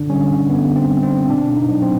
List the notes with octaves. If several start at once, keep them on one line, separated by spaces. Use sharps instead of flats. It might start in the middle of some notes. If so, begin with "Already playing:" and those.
Already playing: D3 D4
G3 C#4
D3 B3
C4
G3
C4
B2 D4
D#4
F#3
C4